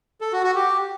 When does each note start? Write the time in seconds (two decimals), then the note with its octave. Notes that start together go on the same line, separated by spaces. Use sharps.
0.21 A4
0.32 F#4
0.44 F#4
0.55 G4